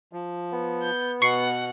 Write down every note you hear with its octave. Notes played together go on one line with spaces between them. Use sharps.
F3
B3
G6
B2 F#5 C#6 C7 C#7